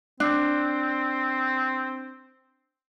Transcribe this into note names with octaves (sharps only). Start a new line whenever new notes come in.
C4 D4